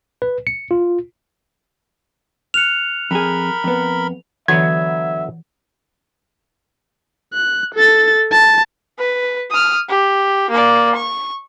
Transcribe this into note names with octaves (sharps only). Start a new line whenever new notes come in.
B4
C#7
F4
F6 F#6 C#7 F7
F2 G#4 A#4 B5
F2 B3
D3 E3 F#3 B3 E5 G#6
F#6
A4 A6
A5
B4
D#6 F6
G4
A#3 D5
C#6